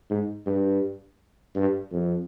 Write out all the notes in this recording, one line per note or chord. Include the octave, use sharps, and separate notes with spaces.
G#2
G2
G2
F2